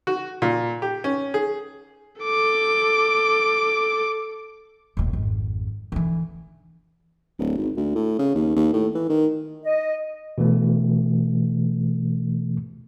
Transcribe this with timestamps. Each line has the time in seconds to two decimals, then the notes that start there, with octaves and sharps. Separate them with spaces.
0.07 F#4
0.42 A#2
0.82 G4
1.04 C#4
1.34 G#4
2.22 A4 D6
4.97 D#1 A2
5.13 G#1 F2
5.92 D3 E3
7.39 D1
7.58 G#1
7.77 D2
7.95 A2
8.19 C#3
8.35 D#2
8.56 D#2
8.73 A2
8.95 E3
9.10 D#3
9.63 D#5
10.38 B2 E3 A3